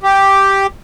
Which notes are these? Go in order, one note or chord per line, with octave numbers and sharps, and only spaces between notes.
G4